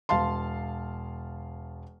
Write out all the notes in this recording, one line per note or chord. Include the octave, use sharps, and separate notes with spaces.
E1 F5 A5 C6